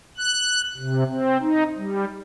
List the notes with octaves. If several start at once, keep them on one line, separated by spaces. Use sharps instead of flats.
F#6
C3
C4
D#4
G3